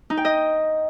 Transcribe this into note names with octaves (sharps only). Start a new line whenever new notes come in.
D#4
G5
D#5